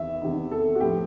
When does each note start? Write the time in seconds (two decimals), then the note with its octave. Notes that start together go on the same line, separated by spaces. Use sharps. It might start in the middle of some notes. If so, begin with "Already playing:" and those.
Already playing: E2 C3 D#3 E5
0.21 E2 C3 D#3
0.51 A4
0.75 F#4
0.80 A2 F3 G4